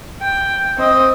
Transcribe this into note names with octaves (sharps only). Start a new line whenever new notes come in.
G5
C4 D#5